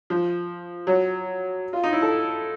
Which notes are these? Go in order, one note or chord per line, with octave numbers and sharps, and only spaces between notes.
F3
F#3
F4
D#4
E4
A4